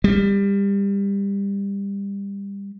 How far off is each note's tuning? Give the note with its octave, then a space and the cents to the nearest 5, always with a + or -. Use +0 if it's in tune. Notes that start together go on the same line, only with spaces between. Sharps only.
G3 +25